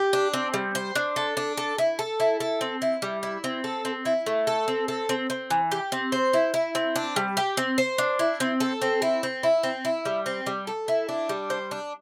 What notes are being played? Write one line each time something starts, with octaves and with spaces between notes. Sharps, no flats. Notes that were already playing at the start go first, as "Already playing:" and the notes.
Already playing: G4
D4
C4
G3
C5
D4
A4
D4
A4
E4
A4
E4
A4
C4
E4
G3
E4
C4
A4
C4
E4
A3
A4
C4
A4
C4
C4
E3
G4
C4
C5
E4
E4
C4
D4
G3
G4
C4
C5
D4
E4
C4
A4
C4
E4
C4
E4
C4
E4
G3
C4
G3
A4
E4
D4
G3
C5
D4